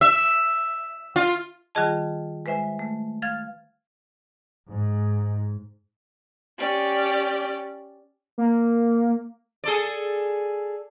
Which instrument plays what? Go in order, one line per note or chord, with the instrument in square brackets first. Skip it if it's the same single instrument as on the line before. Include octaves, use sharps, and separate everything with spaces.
[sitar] E5
F4
[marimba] D#3 G3 F4 G#4 D#5 A5
G#3 B4 C5 E5 G#5
A3
F5 F6 G#6 A6
[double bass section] G#2
[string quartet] C#4 G4 D5
[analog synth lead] A#3
[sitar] G#4 A4 D5